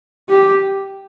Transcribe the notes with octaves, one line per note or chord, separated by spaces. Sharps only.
G4